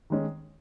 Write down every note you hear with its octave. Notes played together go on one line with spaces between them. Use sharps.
D#3 G#3 C#4